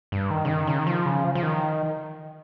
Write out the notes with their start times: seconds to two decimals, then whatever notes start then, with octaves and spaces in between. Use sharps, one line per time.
0.12 G2
0.30 D#3
0.45 C#3
0.50 D#3
0.67 C#3
0.79 D#3
0.87 F3
1.06 C#3
1.24 F3
1.35 F3
1.43 D#3